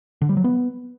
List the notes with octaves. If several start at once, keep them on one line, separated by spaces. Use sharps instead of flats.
D3
G3
F#3
B3